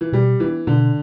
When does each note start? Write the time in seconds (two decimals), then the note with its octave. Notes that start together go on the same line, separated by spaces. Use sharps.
0.01 E3
0.12 B2 G3
0.40 E3 B3 D4
0.67 B2 D3